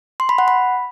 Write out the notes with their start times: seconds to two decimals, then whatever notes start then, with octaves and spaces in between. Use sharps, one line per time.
0.20 C6
0.29 B5
0.38 F#5
0.48 B5